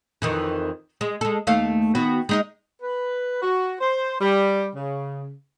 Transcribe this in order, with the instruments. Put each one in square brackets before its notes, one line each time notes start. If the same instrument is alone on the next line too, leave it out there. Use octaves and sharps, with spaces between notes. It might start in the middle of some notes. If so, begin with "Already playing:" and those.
[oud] F2 D#3 E3
G#3
G#3 A4
D#2 A3 F5
D#3 B3 F#4
G#3 D#4 D#5
[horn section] B4
F#4
C5
G3
C#3